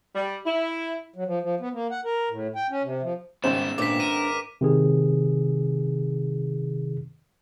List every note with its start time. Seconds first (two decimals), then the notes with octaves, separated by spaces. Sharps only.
0.15 G3
0.46 E4
1.15 F#3
1.27 F3
1.42 F3
1.60 B3
1.73 A#3
1.91 F#5
2.05 A#4
2.30 A2
2.55 G5
2.70 C#4
2.83 C3
3.02 F3
3.44 G#1 C#3 G3 B3 C5 E7
3.78 A#2 B3 C4 D4 D6 B6
4.00 A#4 D#7
4.61 C3 D#3 G#4